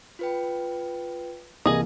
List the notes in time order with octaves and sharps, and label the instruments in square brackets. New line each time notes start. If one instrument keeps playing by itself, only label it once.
[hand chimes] F4 B4 G5
[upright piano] C2 E3 A#3 [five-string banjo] G#4 D#5